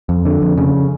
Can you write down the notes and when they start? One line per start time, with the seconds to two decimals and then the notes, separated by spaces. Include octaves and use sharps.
0.09 F2
0.25 D3
0.42 F2
0.58 C#3